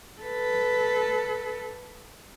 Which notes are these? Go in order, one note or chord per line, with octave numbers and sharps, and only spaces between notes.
A4 B4